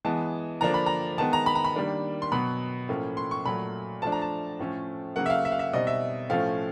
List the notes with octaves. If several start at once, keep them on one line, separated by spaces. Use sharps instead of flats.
E3 G#3 B3 A5
D3 F3 A#3 D4 A#5
B5
A#5
D#3 G#3 B3 A5
A#5
B5
A#5
B5
D#3 G3 A#3 D4
C6
B2 F#3 B3 B5
A2 F3 A#3 C#4
C6
C#6
A#2 F#3 A3 B5
F3 A3 D4 A5
A#5
A5
A2 F3 A3 C#4
C#3 F#3 A#3 F#5
E5
F5
E5
F5
E5
B2 G3 C4 D#4 D#5
E5
A2 F3 A3 C#4 F5